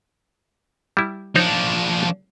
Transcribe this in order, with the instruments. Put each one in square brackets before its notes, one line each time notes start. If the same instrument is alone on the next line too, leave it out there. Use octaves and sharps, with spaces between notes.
[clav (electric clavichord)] G3 E4
[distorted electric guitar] F3 D4 [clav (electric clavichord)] D#4 C5 C#5